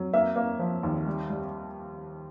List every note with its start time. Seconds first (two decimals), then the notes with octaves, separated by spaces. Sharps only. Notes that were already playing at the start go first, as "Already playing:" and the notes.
Already playing: F#3
0.13 A#3 E5
0.36 A#3
0.59 F3
0.83 D#2
1.06 G3
1.30 G3